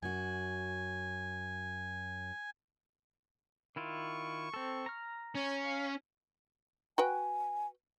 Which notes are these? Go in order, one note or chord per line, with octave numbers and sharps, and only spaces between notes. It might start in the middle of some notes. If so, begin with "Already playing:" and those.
F#2 F#4 G#5
D#3 E4 F4 C#6
C4 A4
A#5 F6
C#4 C#5
F5
F#4 B4 G5 G#5